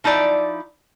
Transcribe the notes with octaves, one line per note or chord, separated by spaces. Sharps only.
F3 D#4 E4 D5